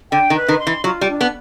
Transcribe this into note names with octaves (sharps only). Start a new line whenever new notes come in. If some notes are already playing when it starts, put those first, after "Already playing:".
D3 G5
D#3
B4
D#3
C6
E3
F#3 F4
G3
D4
B3